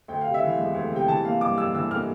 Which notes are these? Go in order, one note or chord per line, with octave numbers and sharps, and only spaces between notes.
D2 G5
C3 F5
E5
E3 F5
E1
D2
C3 G5
E3 A5
A#3 F5
G2 D6
G2 E6
E3 E6
A#3 F6